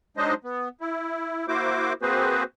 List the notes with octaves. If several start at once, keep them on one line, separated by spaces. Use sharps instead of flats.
F#3 G#3 D4 D#4 C5 D#5
B3
E4
A#3 E4 F#4 C5 D6
A#3 C4 F#4 G#4 B4 C5